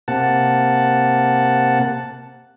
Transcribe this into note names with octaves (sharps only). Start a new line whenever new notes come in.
C3 A#3 F#5 A5